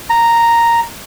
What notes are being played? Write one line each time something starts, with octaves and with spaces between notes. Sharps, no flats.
A#5